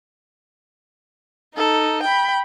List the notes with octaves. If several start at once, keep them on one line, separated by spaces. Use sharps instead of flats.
D#4 A4
G5 B5